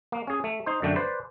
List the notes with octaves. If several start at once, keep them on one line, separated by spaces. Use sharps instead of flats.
A#3
C#4 G#4
A3
D#4 C5
F#2 D3 A3 D4 G5
B4 C5 D5